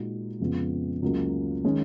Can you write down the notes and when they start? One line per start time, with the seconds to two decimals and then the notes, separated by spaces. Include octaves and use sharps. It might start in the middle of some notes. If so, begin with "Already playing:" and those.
Already playing: A#2 G#3 D#4 F#4
0.40 F2 C#3 G#3 B3 F4
1.02 C#2 C#3 F#3 A#3
1.64 D#3 G#3 C#4